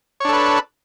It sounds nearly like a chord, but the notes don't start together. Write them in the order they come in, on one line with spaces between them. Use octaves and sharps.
C#5 D4 A4 B4